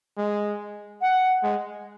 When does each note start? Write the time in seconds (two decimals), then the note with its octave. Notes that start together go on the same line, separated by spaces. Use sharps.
0.17 G#3
1.02 F#5
1.43 G#3